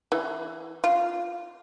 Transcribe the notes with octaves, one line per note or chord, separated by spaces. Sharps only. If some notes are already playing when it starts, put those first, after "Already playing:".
E3
F4